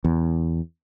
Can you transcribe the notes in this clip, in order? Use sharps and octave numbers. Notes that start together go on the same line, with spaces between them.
E2